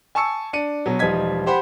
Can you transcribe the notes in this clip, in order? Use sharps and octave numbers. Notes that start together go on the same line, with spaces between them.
G#5 A5 C#6 E6 C#7
D4 C#7 D#7
B2 F#3
E1 F3 G3 D#4 G#6 B6
G4 C5 F#5 B5